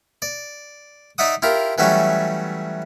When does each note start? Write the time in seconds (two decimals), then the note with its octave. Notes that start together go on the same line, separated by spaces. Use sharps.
0.22 D5
1.18 D#4 D5 E5 F#5 D#6
1.42 E4 F4 G4 A#4
1.78 E3 F#3 G3 A3 C#4 F#4